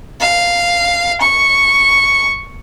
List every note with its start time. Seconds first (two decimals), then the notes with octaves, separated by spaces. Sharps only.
0.20 F5
1.21 C#6